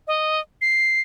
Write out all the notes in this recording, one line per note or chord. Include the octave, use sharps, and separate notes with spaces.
D#5
C7